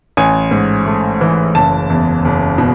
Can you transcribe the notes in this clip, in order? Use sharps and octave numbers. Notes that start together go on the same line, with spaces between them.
A1 G#5
G#2
A3
E3
F#1 A5
E2
F#1
B2